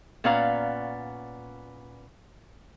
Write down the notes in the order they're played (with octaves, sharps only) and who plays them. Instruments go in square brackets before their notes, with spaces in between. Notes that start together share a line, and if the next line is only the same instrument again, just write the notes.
[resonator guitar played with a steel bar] A#2 B3 C#4 D5 F5 A#5